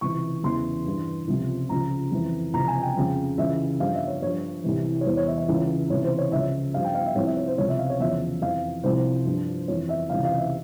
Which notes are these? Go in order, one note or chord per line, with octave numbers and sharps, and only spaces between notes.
C#2 C3 E3 C#6
E2 C#3 E3 C6
G2 E3
C#2 C3 F3
C#2 C#3 F3 A#5
F2 E3
C#2 C3 F3 A#5
G#5
G5
F2 C#3 F3
C#2 C#3 E3 E5
G2 F3 F5
E5
C#5
G2 F3 C#5
C2 C3 E3
C#5
E2 E3 C5
C#5
E5
E5
C#2 C#3 E3
C#2 C3 E3 C#5
C5
C#5
C#2 C#3 F3 E5
G2 F3 F5
G5
F5
E5
C2 C3 F3 C#5
E5
C#5
C5
C#2 C3 F3 C#5
E5
F5
C#5
E2 C#3 F3 E5
F2 E3 F5
C2 C3 F3 C5
G2 F3
F2 E3 C#5
E5
C#2 C3 E3 F5
F5
E5